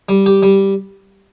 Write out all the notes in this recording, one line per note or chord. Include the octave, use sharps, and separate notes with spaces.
G3
G4
G3